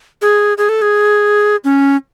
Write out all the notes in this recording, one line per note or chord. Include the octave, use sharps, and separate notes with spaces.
G#4
G#4
A4
G#4
C#4